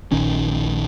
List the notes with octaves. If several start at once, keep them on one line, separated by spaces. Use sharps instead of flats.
A#1 D#3 C#4